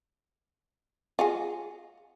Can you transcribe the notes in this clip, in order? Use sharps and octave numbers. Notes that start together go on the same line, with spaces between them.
F4 F#4 G#4